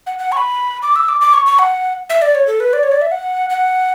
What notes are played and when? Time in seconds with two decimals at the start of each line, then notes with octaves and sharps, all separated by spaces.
0.07 F#5
0.19 F#5
0.32 C#6
0.37 B5
0.83 D6
0.96 E6
1.08 D6
1.21 D6
1.33 C#6
1.46 C#6
1.59 F#5
2.10 E5
2.22 D5
2.35 C#5
2.47 A4
2.60 B4
2.73 D5
2.83 C#5
2.92 D5
3.01 E5
3.12 F#5
3.50 F#5